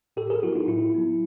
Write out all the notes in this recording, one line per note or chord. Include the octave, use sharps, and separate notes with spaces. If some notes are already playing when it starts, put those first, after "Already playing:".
A2 G4 A4
G#4 A#4
F#3 B3 E4 F#4
D#4 F4
A2 E4
F#3 B3